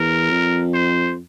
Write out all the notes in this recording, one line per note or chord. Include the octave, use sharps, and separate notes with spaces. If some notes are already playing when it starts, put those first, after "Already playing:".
Already playing: E2 A#4
F2
C5